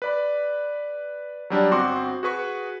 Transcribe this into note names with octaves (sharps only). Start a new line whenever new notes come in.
B4 D5 B5
F#3 G3 D4
G1 C4 F#4 C6 D6
F#4 G#4 B4 C#6